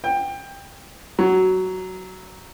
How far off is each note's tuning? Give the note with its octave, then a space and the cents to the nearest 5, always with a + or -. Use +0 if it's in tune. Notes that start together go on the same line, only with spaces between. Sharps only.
G5 +20
F#3 +10